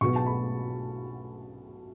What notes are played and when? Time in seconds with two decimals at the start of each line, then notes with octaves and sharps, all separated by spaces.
0.01 B1 B2 B3 C#6
0.16 A5
0.26 B5